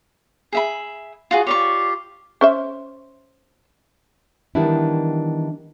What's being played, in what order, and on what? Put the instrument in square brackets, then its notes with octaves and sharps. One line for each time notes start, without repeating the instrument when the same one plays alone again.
[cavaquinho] G#4 E5 B5
F4 F#4 G#4
[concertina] F4 G4 C6 [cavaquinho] C#5 D5 C#6
[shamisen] C#4 C5 E5
[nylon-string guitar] D#3 E3 G3 B3 D4 E4